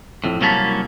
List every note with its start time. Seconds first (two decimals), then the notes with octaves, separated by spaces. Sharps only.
0.24 F2 A2
0.40 C2 F#3 A#3 C#4 A5 B5